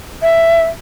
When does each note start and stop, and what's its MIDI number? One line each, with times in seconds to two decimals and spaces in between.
0.22 0.65 76